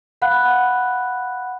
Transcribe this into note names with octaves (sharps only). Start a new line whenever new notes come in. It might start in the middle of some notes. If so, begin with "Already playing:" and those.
F5 F#5 B5 F#6